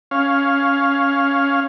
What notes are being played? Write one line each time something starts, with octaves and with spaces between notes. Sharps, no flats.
C#4 F5